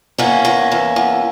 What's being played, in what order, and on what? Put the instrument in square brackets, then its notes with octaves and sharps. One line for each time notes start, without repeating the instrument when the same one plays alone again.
[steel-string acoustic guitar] E2 A#3 C#4
E2
E2
E2